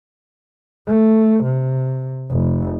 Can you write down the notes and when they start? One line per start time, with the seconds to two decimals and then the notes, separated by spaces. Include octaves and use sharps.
0.87 A3
1.44 C3
2.31 F1